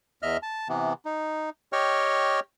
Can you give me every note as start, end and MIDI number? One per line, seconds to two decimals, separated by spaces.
0.23 0.37 40
0.23 0.37 75
0.23 0.37 76
0.23 0.37 89
0.43 0.68 81
0.69 0.93 48
0.69 0.93 52
0.69 0.93 59
1.05 1.50 63
1.73 2.40 67
1.73 2.40 73
1.73 2.40 75
1.73 2.40 79
1.73 2.40 85
1.73 2.40 89